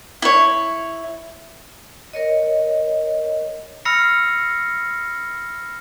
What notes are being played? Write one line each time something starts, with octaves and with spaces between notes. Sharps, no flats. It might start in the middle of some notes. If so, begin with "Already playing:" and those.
E4 C#5
A#4 C#5 D#5
B5 E6 F6 A#6 C7 C#7